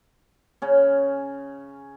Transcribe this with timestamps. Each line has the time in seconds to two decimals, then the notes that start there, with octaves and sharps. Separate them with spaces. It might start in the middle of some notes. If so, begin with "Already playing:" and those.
0.62 C#3 C#4